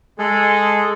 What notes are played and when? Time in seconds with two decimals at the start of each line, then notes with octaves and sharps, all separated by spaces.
0.19 G#3 G#4 A4